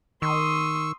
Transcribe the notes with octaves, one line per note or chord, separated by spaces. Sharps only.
D#3 C6 C#6 D#6 E6